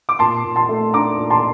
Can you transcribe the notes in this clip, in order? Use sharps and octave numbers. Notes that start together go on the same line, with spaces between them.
D6
A#2 A5 C6
A#2
A5 C6
A3
D4 A#5 D6
A#2
A5 C6